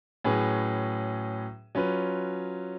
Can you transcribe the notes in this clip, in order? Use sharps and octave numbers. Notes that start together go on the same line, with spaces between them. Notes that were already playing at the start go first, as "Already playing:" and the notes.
A2 F#3 C#4 G#4 B4
F#3 C#4 F4 B4